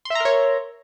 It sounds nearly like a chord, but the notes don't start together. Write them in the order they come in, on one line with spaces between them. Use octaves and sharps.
C6 E5 A#5 A#4 C#5